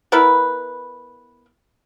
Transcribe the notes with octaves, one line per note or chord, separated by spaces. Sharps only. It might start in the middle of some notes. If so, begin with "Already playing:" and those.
B3 E4 A#4 B4